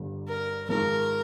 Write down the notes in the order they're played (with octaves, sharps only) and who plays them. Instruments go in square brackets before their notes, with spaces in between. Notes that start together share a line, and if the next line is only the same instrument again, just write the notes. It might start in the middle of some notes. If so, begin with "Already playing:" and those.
Already playing: [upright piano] G1 G2 D3
[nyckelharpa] A#4
[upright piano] G#1 G#2 F3 [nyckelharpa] A#4